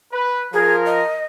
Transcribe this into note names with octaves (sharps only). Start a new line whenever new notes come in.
B4
F3 F4 G#4 A#4
D#5